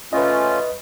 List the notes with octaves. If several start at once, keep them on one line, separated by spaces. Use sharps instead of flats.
A3 C#4 F4 B4 D#5